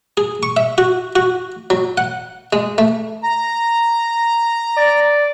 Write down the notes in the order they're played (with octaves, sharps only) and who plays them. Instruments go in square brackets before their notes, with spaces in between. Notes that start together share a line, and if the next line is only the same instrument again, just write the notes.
[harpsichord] G#4
C#6
E5
F#4
F#4
F#3
F#5
G#3
A3
[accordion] A#5
[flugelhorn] D5